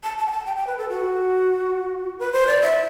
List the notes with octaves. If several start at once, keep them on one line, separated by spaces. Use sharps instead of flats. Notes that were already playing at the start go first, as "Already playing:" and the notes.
A5
A5
G5
A5
G5
G5
B4
A4
F#4
B4
C5
D5
E5